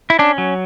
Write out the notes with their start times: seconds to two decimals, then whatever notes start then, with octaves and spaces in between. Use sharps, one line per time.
0.10 E4
0.19 C#4 D4
0.38 F#3